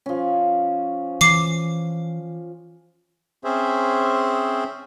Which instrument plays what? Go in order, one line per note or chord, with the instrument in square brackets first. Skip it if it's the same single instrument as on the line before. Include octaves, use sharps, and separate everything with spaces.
[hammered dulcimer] F3 C#4
[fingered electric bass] E3 [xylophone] D6 C7
[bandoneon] C4 C#4 G#4 C5 E5